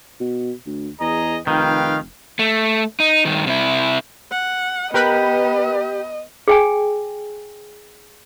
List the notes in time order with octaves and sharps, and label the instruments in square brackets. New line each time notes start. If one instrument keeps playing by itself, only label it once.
[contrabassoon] B2
D2
[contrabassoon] E2 [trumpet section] G#4 D#5 A#5
[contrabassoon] F1 [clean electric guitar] D#3 [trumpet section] B4 F5 G5
[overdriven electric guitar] A3
D#4
G2 D#3
C3 E4
[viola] F#5
[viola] B3 [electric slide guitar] G4 [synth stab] A#4 B4 B5 [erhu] D#5
[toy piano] G#4 G5 G#5